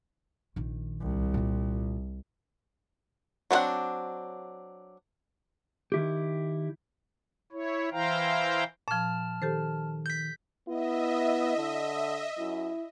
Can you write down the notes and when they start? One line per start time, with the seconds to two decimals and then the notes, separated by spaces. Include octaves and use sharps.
0.56 A#1 D#3
1.01 C2
1.34 A#2 F4
3.51 F#3 B3 C4 D4 F#5
5.92 D#3 E4 G4
7.52 E4 C#5
7.91 E3 E4 C5 F5 G5 A#5
8.88 A#2 F3 A5 F6
9.42 D#3 G4 A4 C5
10.06 G6 B6
10.68 B3 E4 D#5 E5
11.57 D3
12.38 F#2 E4